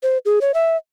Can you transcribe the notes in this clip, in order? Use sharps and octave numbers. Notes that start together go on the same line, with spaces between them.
C5
G#4
C#5
E5